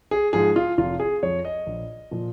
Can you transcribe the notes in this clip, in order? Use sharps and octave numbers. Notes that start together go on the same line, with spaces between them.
G#4
G#2 F3 G#4
F4
F1 F4
G#4
F2 F3 C#5
D#5
A#1
A#2 F3